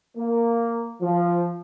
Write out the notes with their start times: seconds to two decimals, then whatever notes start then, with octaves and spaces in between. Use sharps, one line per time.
0.17 A#3
1.01 F3